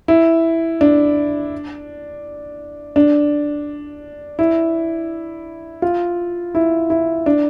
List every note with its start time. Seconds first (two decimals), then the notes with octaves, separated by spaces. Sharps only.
0.08 E4
0.81 D4
2.96 D4
4.39 E4
5.82 F4
6.55 E4
6.90 E4
7.26 D4